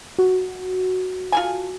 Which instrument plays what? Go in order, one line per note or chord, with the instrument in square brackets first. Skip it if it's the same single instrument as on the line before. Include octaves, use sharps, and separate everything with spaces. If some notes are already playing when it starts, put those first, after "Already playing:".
[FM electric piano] F#4
[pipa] F4 A4 G#5